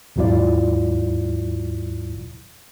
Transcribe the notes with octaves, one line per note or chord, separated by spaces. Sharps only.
D#2 G#2 F#3 E4 F4 D5